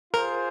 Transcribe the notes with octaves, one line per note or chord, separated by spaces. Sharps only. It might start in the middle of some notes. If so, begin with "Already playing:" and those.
F4 G#4 A#4 C5